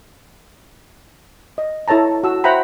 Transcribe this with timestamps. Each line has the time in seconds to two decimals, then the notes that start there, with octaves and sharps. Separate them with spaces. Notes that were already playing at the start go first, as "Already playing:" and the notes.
1.58 D#5
1.88 E4 A4 C#5 A5 A#5
2.24 F#4 E6
2.44 C5 E5 F#5 G5 A#5 B5